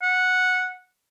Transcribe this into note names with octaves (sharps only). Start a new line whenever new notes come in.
F#5